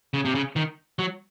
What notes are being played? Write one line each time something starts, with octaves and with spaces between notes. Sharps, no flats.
C#3
C3
C#3
D#3
F#3